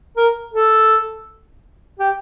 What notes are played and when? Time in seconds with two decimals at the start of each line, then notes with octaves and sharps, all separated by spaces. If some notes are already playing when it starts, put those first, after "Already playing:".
0.16 A#4
0.53 A4
1.99 G4